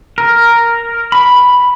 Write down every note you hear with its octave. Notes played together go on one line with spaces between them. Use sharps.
A#4
B5